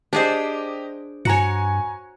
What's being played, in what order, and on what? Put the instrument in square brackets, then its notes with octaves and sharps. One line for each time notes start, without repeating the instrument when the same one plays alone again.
[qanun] D4 G#4 C5 [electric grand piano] G4 D#5
[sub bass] G2 [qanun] F#4 C#5 [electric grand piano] G#5 A#5 C#7